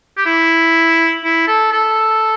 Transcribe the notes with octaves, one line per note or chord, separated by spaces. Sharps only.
G4
E4
E4
A4
A4